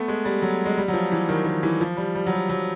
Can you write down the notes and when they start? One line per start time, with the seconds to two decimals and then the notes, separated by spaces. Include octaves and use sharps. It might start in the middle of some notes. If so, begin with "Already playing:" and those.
Already playing: A3 B3
0.08 G#3
0.25 G3
0.42 F#3
0.66 G#3
0.77 G3
0.88 F#3
0.94 F3
1.12 E3
1.29 D#3
1.45 D#3
1.63 E3
1.80 F3
1.97 G3
2.15 G3
2.26 F#3
2.32 G3
2.49 F#3